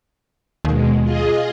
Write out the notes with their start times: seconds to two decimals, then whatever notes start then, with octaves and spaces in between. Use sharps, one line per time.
0.65 D#2 B2 G#3
1.03 F4 G#4 D#5